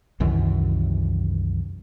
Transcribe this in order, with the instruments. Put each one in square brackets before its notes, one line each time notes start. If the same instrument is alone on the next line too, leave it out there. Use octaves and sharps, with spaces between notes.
[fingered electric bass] C2 F#2 D#3 E3